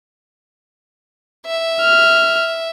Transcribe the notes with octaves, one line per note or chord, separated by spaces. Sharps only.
E5
F6